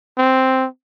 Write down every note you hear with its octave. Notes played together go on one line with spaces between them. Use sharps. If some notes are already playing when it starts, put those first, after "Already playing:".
C4